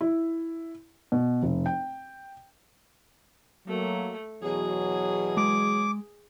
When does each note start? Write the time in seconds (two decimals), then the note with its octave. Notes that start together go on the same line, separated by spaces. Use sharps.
0.01 E4
1.12 B2
1.43 F1
1.66 G5
3.67 F#3 A3 A#3
4.42 E2 B2 F#3 G#4
5.37 G#3 D6